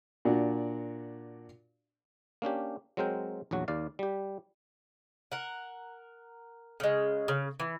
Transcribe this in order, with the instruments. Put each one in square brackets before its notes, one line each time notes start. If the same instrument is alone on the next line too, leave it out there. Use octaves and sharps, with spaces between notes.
[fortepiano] A#2 D4 F#4
[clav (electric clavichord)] A#3 C#4 D4 G4
F#3 G#3 C4 A#4 G5
A#1 E2 F#3 F#4
D#2 D5 F5
G3 G4
[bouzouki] A#4 F#5
C#3 G#3
C#3
E3